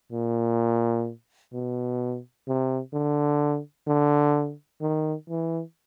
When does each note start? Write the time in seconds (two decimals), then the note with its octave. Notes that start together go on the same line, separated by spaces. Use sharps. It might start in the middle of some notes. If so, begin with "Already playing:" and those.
0.12 A#2
1.53 B2
2.48 C3
2.93 D3
3.87 D3
4.81 D#3
5.29 E3